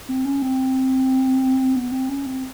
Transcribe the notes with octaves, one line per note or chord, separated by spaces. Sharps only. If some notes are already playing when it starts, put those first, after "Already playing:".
C4
C#4
C4
B3
C4
C#4
C4